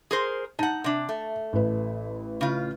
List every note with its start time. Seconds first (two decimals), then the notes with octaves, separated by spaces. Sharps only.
0.11 G#4 A#4 C5
0.59 D#4 F#5 A5
0.84 C3 D4
1.09 A3
1.53 A1 B4
2.41 C#3 F4